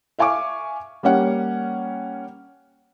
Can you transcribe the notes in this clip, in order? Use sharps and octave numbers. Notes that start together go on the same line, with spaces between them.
E5 F5 G#5 C#6 D6
G3 A#3 C#4 F#5